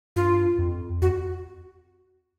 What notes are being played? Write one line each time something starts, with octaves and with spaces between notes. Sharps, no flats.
G2 F4
F2
F2 F#4